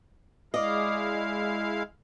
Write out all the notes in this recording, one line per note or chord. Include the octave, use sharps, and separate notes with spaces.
G#3 E4 D5 D#5 F5